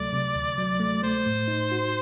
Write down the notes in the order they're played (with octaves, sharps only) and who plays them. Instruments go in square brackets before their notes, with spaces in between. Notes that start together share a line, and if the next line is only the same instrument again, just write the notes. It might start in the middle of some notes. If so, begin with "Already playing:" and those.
Already playing: [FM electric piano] D2 C3 F#3 A3 [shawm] D5
[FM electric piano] C3
D2
F#3
A3
[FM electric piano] A3 [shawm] C5
[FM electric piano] A2
D#4
F#4